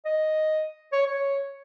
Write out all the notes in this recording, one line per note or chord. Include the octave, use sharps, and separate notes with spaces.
D#5
C#5
C#5